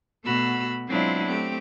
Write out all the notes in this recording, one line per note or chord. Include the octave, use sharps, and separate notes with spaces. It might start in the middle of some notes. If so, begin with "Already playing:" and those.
B2 A3 F#4 B5 E6
F#3 G#3 C4 D4 E4 F4
A3 C4 G4